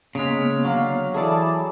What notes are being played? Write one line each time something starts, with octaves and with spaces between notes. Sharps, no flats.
C#3 G#3 A#3 B3 F6 B6
D3 F#3 D5 F5
E3 G#4 A4 D5 E5 G#5 A5 B5